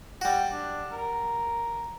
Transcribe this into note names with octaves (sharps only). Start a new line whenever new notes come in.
G3 F#4 G5
D4
A#4